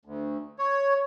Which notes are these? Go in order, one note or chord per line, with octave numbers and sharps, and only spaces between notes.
D2
C#5